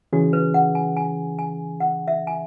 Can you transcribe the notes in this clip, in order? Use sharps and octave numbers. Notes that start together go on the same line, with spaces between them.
C#3 E3 C#4 F#4 G#4
B4
F#5
G#5
G#5
G#5
F#5
E5
G#5